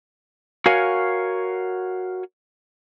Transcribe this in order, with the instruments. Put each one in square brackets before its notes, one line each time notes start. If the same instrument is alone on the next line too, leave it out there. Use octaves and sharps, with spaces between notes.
[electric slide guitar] F#4 A#4 C#5 F5 G#5